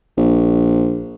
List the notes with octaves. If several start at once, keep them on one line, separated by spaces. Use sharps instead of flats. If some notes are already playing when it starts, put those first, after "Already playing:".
A#1